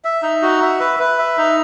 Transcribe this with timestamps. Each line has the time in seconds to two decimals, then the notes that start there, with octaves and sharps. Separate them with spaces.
0.04 E5
0.22 D#4
0.42 F#4
0.62 E5
0.80 B4
0.99 B4
1.19 E5
1.37 D#4